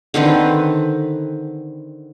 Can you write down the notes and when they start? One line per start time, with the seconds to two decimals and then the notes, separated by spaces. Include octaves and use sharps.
0.14 D3 D#3 C4 B4